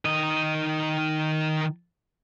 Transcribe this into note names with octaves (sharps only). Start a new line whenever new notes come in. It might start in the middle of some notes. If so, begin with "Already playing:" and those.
D#3 D#5